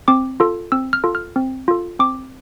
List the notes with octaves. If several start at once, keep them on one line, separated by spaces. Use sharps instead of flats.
C4 D6
F4 A4
C4 E6
F6
F4 A4
F6
C4
F4 A4
C4 D6